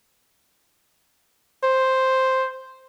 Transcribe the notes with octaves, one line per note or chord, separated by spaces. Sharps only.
C5